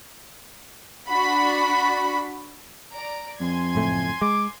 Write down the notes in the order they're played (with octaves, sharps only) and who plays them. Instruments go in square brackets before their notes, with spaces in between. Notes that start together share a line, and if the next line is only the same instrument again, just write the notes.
[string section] D4 F#4 B5
[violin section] D5 A#5 D7
[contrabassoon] F2 [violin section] G#5 C6 G#6
[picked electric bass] F#1 A2 A3
[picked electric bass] G#3 [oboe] D6